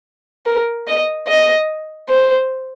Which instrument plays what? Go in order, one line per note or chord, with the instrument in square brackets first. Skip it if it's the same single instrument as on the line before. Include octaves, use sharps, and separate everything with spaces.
[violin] A#4
D#5
D#5
C5